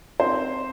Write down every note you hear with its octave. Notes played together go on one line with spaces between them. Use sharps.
C4 D#4 C5